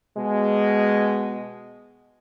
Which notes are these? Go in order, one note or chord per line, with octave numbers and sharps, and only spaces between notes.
B2 G#3